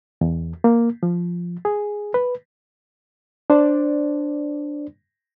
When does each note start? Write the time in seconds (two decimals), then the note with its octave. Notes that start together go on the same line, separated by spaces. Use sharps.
0.21 E2
0.64 A#3
1.03 F3
1.65 G#4
2.14 B4
3.50 D4 C5 D5